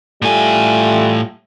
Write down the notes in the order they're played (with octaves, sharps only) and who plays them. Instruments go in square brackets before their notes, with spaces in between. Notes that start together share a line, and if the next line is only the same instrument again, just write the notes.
[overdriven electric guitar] A2 G#5 [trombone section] G3 A3 F4